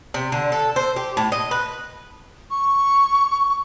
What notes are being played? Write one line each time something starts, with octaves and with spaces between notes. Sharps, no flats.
C3
D3
A4
C5
G4
A2
D#5
B4
C#6